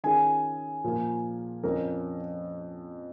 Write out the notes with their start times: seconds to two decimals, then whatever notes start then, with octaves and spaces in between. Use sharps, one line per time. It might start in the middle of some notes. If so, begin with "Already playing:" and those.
0.04 D#3 C#4 F4 G#4 G#5
0.84 A#2 F3 A#3 F4
1.63 F2 F3 C#4 A#4